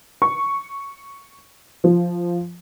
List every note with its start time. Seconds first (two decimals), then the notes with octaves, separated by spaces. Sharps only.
0.22 C#6
1.84 F3